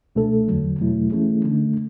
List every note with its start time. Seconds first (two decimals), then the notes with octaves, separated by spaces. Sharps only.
0.15 C#2 B2 A3 D4 A4
0.48 E2 D3 F#3
0.79 E2 B2 F#3 A3 E4
1.12 E3 A3 C#4 E4 G#4
1.44 D3 A3 D4